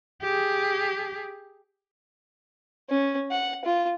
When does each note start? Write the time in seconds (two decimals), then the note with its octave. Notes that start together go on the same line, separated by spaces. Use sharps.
0.22 G4 G#4
2.90 C#4
3.31 F#5
3.65 F4